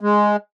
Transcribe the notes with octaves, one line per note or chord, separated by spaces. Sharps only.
G#3